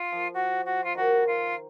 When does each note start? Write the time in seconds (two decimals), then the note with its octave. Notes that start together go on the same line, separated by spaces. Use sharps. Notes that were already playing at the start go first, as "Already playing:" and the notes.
Already playing: F4
0.12 F3
0.33 F#4
0.65 F#4
0.84 F4
0.95 D#3 F#4
1.26 F4